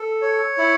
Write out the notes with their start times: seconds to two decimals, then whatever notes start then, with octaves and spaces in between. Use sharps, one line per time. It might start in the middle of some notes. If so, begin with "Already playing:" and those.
Already playing: A4
0.21 C#5
0.58 E4